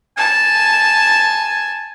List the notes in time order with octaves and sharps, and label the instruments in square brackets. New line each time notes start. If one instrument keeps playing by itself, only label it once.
[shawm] G#5 [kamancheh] A5